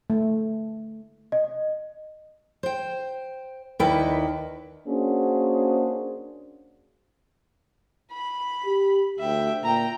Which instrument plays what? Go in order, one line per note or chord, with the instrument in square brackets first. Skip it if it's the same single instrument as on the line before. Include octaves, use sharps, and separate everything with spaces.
[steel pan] A3
[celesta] D#5
[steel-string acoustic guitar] C5 G5
[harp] D#2 E4 D5 [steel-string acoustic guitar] A#4 B4 G5
[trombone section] A#3 C#4 D4 F#4 G#4 C5
[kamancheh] B5
[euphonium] G4
[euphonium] D2 [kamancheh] E5 G5
[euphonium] A#2 [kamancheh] G5 A#5